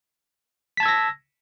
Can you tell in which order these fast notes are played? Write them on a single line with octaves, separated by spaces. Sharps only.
B6 A5 G#6 E6 A#6